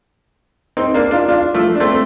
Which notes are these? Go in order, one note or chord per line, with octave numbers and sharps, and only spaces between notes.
C4 D#4
A#3 D4
D4 F4
D4 F4
F3 A3
D4
A3 C4